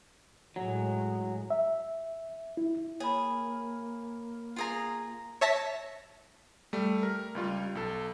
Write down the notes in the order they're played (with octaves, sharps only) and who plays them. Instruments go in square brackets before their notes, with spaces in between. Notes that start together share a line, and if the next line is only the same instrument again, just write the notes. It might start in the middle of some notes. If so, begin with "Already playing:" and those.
[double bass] A2 G#3 [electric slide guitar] F#3
[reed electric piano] E5
E4
[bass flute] A#3 [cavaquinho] G#4 [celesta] C#5 B5
[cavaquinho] F4 G#4 A#5
[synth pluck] C#5 E5 A5 A#6 B6
[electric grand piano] G3 A3
A#4
C#2 G3 F4
B1 A4